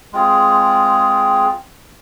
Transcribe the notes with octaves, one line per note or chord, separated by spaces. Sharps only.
G#3 C4 F4 G#4